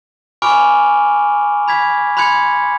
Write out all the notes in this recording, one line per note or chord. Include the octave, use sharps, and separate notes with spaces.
G#5 B5 C#6 D6 F6 D7
B5 G#6 B6
B5 C6 F#6 G#6 C#7